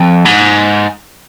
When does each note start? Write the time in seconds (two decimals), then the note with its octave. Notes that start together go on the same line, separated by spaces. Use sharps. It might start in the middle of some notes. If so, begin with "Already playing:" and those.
Already playing: F2
0.25 G#2